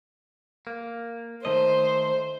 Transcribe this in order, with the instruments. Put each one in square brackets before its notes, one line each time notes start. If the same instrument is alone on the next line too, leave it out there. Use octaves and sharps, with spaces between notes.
[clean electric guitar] A#3
[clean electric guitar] D#3 A3 D#5 [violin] C5